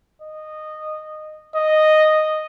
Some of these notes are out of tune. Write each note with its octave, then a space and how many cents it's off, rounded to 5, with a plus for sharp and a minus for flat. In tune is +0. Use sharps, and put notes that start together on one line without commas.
D#5 -15
D#5 -5